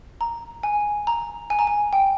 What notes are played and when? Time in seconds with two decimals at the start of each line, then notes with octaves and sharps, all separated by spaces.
0.21 A#5
0.63 G#5
1.07 A#5
1.50 G#5
1.59 A#5
1.67 G#5
1.93 G5